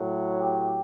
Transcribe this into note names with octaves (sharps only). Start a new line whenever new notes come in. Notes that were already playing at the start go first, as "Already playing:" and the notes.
Already playing: A2 F#3
G4